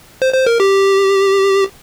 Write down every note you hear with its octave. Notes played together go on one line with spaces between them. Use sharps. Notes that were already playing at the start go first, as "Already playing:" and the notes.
C5
C5
A#4
G4